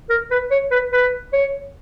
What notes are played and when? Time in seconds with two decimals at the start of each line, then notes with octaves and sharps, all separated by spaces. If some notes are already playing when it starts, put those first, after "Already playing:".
0.10 A#4
0.31 B4
0.51 C#5
0.71 B4
0.93 B4
1.33 C#5